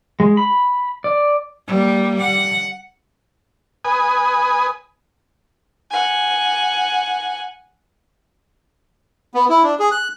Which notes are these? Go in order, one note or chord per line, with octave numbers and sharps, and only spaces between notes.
G#3
B5
D5
G3 A#3
F#5
B4 G#5 D#6
F#5 G#5
B3
E4
D4
G#4
F#6